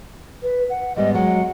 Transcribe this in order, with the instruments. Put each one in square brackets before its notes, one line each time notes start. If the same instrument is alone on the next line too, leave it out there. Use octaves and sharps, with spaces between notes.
[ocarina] B4
F#5
[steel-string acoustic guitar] G#2 G3 B3 [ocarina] D#5
[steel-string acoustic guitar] F#3 G#3 [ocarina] F#5